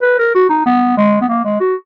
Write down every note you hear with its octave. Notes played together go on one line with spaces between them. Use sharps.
B4
A#4
F#4
D#4
B3
G#3
B3
A#3
G#3
F#4